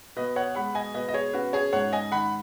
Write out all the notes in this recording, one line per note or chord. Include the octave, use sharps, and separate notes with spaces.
B2 B4 D#5
C#5 F#5
G#3 F#5 B5
D#5 G#5
B2 B4 D#5
D#5
G#4 C#5
C#4 F#4 B4
G#4 C#5
G#2 C#5 F#5
D#5 G#5
D#3 F#5 B5